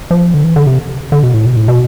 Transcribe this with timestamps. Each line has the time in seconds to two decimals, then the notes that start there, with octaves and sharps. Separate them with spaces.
0.11 F3
0.34 D3
0.44 E3
0.56 D3
0.67 C3
1.12 D3
1.23 B2
1.34 A2
1.46 B2
1.57 A2
1.68 B2